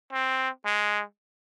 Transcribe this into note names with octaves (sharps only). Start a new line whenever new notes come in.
C4
G#3